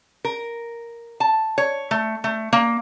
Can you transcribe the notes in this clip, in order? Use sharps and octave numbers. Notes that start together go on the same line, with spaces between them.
A#4
A5
C#5
A3
A3
A#3